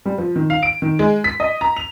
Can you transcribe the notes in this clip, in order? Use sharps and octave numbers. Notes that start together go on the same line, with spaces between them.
G3
F3
D#3
F5
D7
D#3
G#3
B6
D#5
A#5
F7